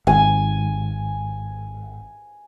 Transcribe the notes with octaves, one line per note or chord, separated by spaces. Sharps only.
G#1 G#5